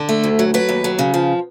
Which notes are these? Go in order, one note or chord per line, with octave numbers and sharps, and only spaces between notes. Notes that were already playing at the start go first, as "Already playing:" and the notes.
Already playing: D3
A3
D2
F#3
F#3 B4
D#2
F#3
C#3
F3